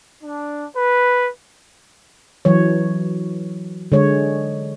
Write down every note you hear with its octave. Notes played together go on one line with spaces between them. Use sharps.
D4
B4
E3 F#3 C#5
D3 G#3 C#5